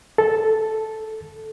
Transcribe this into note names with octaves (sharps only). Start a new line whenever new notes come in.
A4